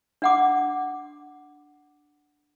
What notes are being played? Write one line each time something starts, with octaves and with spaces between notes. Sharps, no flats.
D4 F#5 D6